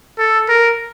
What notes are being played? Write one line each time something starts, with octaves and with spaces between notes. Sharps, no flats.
A4
A#4